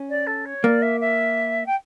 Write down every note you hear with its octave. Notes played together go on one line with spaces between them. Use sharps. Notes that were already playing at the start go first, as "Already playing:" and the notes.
Already playing: C#4
D5
A4
C#5
A#3 D5
E5
E5
G5